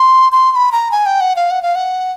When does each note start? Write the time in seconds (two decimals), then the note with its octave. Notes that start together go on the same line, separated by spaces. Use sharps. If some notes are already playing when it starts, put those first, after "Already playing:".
Already playing: C6
0.32 C6
0.52 C6
0.56 B5
0.72 A#5
0.91 G#5
1.06 G5
1.21 F#5
1.36 F5
1.51 F#5
1.63 F5
1.75 F#5